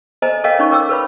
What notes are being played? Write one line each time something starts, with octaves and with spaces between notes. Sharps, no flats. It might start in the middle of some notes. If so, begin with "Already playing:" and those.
A4 C5 D#5 G#5 A#5
A4 A#4 C#5 D#5 F5 G5
C#4 D#4 C#5 C#6
A#4 C#5 G5 D6 E6
A4 B4 C#5 B5